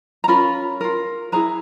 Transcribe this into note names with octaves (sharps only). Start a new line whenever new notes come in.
A#5
C#4 F4 A#4 B5
F4 A#4
E4 G#4 B4 A#5